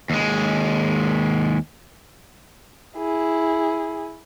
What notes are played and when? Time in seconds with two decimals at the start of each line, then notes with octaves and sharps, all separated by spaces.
0.10 D#2 G#3
2.98 E4 G#4